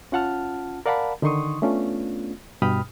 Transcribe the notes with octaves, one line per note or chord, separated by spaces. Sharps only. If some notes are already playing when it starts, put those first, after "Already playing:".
C#4 F4 F#5 A5 F6
A#4 D5 F5 F#5 A5 B5
D3 D#3 D#4 C6 C#6 D#6
A3 B3 C#4 D4 F4
G2 B2 G5 B5 D#6 F6